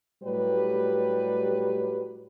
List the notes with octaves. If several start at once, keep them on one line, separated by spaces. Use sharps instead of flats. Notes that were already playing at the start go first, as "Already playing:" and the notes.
A2 F#3 G3 G4 B4